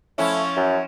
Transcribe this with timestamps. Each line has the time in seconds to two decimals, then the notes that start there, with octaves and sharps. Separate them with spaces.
0.18 F3 A3 C#4 E4
0.56 F#2